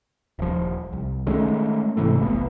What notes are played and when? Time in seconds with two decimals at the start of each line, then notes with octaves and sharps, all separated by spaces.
0.39 D#1 F3
0.93 C2
1.26 D#3 G#3 A3 C#4
1.97 G#2 C3 E3 A3
2.19 F1 B1 B2